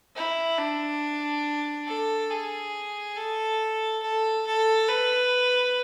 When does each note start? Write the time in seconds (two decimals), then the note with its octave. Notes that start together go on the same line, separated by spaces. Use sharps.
0.16 E4
0.58 D4
1.87 A4
2.30 G#4
3.17 A4
4.02 A4
4.46 A4
4.89 B4